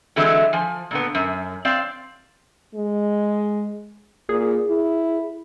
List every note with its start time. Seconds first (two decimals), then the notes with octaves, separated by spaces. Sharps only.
0.16 D3 E3 F#3 G#3 A3 C4
0.53 F3 G#5
0.91 A#2 D3 B3
1.15 F#2
1.65 C4 D5 F5
2.75 G#3
4.29 A#2 G#4
4.68 E4